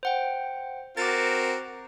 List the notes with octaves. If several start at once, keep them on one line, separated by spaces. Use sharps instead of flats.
C5 F#5 G5
C4 F#4 A#4 D6 A6